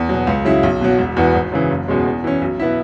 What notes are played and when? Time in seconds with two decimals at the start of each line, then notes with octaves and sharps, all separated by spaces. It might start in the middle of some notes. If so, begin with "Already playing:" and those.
Already playing: E2
0.09 B2 F#3
0.27 C#2
0.45 C#3 F#3 E4
0.63 B1
0.81 B2 F#3
0.99 E1
1.16 E2 E3 B3 F#4
1.35 G#1
1.52 F#2 C#3 E3
1.70 F#1
1.88 E2 B2 G#3 C#4
2.06 E2
2.24 E3 C#4
2.41 B1
2.60 B2 B3 E4